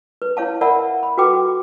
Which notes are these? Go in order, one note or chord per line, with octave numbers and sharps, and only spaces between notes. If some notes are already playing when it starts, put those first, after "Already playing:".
B4
E4 C#5 F5 A5
A#4 D5 E5 F#5 A5 B5
B5
F#4 A4 B4 G5 D6